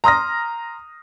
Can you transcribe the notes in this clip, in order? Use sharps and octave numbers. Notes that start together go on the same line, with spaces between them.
A#5 C6 D#6 F6 A#6